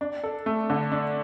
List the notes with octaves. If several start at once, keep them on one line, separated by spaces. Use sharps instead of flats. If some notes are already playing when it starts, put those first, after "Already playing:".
D4
A4
A3
D3
D4